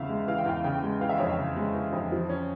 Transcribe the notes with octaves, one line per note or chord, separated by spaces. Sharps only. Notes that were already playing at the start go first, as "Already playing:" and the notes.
Already playing: E2 C#3 E3 E5 F5
G#3
E3 F5
G5
E2 F5
C#3 G5
G#3
E3 F5
E5
F2 C#5
E5
C#3
G#3
E3
F2
F3
C#4